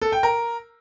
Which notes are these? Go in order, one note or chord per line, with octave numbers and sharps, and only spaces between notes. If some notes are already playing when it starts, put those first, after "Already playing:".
A4
G5
A#4